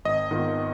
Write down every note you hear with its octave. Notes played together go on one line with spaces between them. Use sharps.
G#1 D#5
G#2 D#3 B3 F4